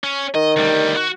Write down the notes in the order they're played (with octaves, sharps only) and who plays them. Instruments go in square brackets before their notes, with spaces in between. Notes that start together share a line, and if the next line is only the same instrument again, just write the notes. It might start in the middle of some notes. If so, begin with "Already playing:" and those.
[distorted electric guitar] C#4
[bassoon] D#3 [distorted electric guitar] D#5
[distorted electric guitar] D2 G3
F#4